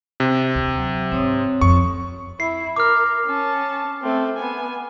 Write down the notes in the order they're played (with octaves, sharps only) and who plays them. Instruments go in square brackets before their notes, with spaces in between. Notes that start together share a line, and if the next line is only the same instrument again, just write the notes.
[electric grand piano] C3
[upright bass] D2
[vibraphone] F#3
[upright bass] G#2 [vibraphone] C4 C#5 D#6
[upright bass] F2 [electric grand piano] C#6
[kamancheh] E4 [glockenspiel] C7
[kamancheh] A#4 [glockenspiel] D6 F6
[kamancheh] C#4 A5
A3 C4
B3 G#5